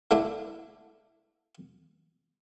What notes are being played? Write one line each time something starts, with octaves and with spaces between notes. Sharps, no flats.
D3 A3 D4 E4